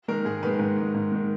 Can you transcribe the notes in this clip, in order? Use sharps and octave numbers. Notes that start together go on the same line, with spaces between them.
D#3 G#3 A#4
G#2 G#4
D#3 G#3 B4
G#2 B4
D#3 G#3
G#2
D#3 G#3